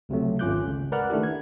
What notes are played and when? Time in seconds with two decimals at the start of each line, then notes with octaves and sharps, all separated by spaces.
0.09 C#2 C3 F#3 A3
0.39 G#1 C#4 F4 D6 F#6 G6
0.66 C#2
0.92 A#4 B4 D5 F#5 F6 F#6
1.10 D#3 A3 D4 E4 G4
1.23 G#6